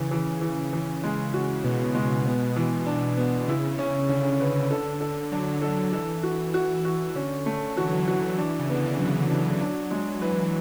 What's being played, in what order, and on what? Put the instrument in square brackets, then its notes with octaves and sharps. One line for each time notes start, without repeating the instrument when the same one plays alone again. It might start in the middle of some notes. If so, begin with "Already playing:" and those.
Already playing: [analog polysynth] C#3 [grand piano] E3
[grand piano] E3
E3
E3
[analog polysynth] C#3 [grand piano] G#3
[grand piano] F#4
[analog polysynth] B2 [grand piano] B3
[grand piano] G#3
B3
E3
D4
B3
[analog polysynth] C#3 [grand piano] E4
[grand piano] C#4
[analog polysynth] D3 [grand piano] C#4
[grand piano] B4
A4
A4
[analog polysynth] F#3 [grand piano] D4
[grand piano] A4
[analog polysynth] E3 [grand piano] A4
[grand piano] F#4
F#4
F#4
[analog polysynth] D3 [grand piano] C#4
[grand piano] A3
[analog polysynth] E3 [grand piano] F#4
[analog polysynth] F#3
E3
[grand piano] F#4
D4
[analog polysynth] C#3
[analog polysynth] D3 [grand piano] B3
[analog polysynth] E3
[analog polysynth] F#3 [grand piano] B3
[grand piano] D4
D4
G#3
[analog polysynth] E3 [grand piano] B4